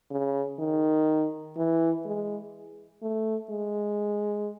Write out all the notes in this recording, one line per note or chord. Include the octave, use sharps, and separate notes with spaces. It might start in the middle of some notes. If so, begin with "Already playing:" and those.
C#3
D#3
E3
G#3
A3
G#3